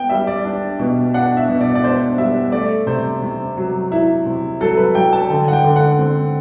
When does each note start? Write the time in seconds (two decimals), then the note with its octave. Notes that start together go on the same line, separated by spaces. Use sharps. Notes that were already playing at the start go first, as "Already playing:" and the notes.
Already playing: B3 G5
0.09 G3 E5
0.27 D5
0.45 D4
0.80 B2
1.14 D4 F#5
1.37 E5
1.49 B2
1.61 D5
1.75 D5
1.83 D4 C5
2.18 G3 E5
2.52 A3 D5
2.87 C3 C5
3.22 C3
3.57 F#3
3.92 E4
4.26 C3
4.60 F#3 A4
4.77 B4
4.95 F#3 G5
5.13 A5
5.30 D3 G5
5.48 F#5
5.53 G5
5.64 D3
5.76 F#5
5.99 C4